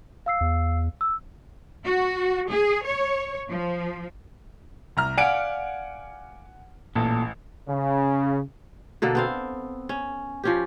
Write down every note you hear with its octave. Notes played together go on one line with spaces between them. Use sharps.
F5 E6 C7
E2
E6
F#4
G#4
C#5
F3
C2 A#5 F6
D5 F5 F#5 G#5 D7
A1 A#2 A4
C#3
B2 D3 A#3 A4
B3 C4 F5
C#4
F3 C#4 G4